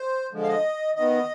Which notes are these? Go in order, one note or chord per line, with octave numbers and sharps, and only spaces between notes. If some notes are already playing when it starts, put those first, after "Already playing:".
Already playing: C5
D3 F3 G#3
F5
D#5
D#3 B3 D#5